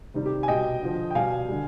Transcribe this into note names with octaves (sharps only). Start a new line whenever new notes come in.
C3 D#3 G3
G4
G#5
B2 G3 D#5 G5
D3 F3
G5
B2 G3 F5 G#5
D3 G3